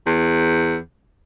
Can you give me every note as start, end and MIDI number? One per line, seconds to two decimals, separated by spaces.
0.06 0.77 40